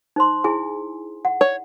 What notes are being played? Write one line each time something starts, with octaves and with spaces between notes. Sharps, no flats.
D#4 C5 C6
E4 G#4 G#5
F#5
C#5